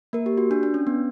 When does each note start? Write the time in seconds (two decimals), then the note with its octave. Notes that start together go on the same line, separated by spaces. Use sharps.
0.13 A#3 A#4
0.26 G4
0.37 F#4
0.51 D4
0.63 D4
0.74 C#4
0.87 B3